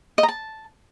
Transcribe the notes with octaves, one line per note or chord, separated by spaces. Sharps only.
D#5
A#5
A5